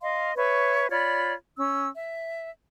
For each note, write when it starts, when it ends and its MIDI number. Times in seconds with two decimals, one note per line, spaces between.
0.01 0.33 75
0.01 0.33 77
0.01 0.33 84
0.36 0.86 71
0.36 0.86 73
0.36 0.86 76
0.36 0.86 85
0.90 1.33 65
0.90 1.33 73
0.90 1.33 74
0.90 1.33 83
1.57 1.87 61
1.57 1.87 88
1.95 2.49 76